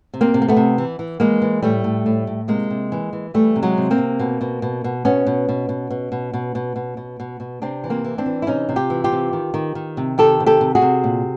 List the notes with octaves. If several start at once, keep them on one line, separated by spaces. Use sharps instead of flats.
C3
A#3 C4
C3
A#3
A3 B3
C3
E3
E3
E3 G#3 A#3
E3
A2 G3 A3
A2
A2
A2
C3 G#3 A#3
C3
E3
E3
E3 G3 A3
C3
F#3 G#3
C3
A#3 C4
C3
B2
B2
B2
B2
B2 B3 C#4
B2
B2
B2
B2
B2
B2
B2
B2
B2
B2
B2
C3 C4 D4
E3
A#3 C4
E3
C4 D4
E3
E4
C3 C#4 D#4
C3
F4 G4
E3
F4 G4
C3
D#3
D#3
D#3
C3
D#3 G4 A4
C3
G4 A4
C3
F#4 G#4
C3
A#2